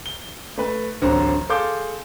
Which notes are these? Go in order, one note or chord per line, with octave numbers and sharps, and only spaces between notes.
G7
A3 B4
D1 A1 D3 C4 A4 A#5
G#4 A4 F5 C6 D6 G6